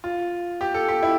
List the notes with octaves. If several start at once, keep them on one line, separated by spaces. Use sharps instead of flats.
F4
G4
A4
G4
E4